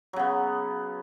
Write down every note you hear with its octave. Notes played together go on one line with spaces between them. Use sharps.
C#3 F#3 B3